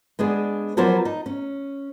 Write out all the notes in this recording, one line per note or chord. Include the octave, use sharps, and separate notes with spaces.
G#3 B3 D4 G#4
F3 F#3 B3 A#4 C5 D5
D#4
C#4